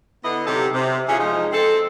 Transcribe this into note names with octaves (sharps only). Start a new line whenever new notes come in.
D3 B3 E4 D#5
C3 F#3 D#4 G4 A4
C3
E3 C#4 F4 G#4
F3 G#3 D#4
C4 A4